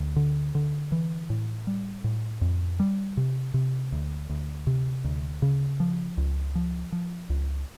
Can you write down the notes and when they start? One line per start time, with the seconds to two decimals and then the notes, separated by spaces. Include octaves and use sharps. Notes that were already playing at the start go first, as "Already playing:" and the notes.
Already playing: D2
0.16 D3
0.55 D3
0.92 E3
1.30 A2
1.67 G3
2.04 A2
2.42 F2
2.80 G3
3.17 C3
3.54 C3
3.92 D2
4.30 D2
4.67 C3
5.04 D2
5.42 C#3
5.80 F3
6.18 C#2
6.55 F3
6.92 F3
7.30 C#2